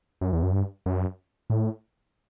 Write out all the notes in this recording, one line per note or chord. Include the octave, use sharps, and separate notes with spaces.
F#2
E2
F#2
G2
F#2
A2